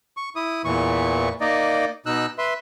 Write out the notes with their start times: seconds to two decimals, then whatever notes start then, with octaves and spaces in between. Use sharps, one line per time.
0.17 C#6
0.36 E4 D#6
0.65 E2 A#2 E3 C#6
1.41 A#3 D#4 D5 D#5
2.06 B2 D#4 E6 F#6
2.38 B4 E5 C6